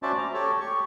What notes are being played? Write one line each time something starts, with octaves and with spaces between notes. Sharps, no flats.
C#4 F#4 C5 D5 E5 A5
A#5 D6
G4 A4 C#5
G4 C#6